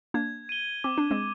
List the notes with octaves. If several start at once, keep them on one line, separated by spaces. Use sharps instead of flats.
A#3 D4 G#6
D#7 G7
C4 D6
D4
G#3 C4